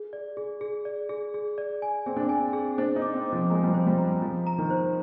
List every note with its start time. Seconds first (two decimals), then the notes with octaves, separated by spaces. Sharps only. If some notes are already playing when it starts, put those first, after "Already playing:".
Already playing: G#4
0.13 D5
0.37 G#4
0.61 G#4
0.85 D5
1.09 G#4
1.34 G#4
1.58 D5
1.82 G#5
2.06 C4 G#4
2.16 D4
2.25 C4
2.29 G#5
2.53 G#4
2.78 D4 C5
2.96 D#4
3.02 D6
3.14 C4
3.25 D6
3.32 F3
3.50 G#3 A#5
3.63 G3
3.68 F3
3.74 C5
3.86 G3
3.98 A#5
4.22 F3 A#5
4.47 A#5
4.58 D#3
4.70 C5